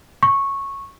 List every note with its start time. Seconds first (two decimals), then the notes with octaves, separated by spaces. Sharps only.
0.23 C#6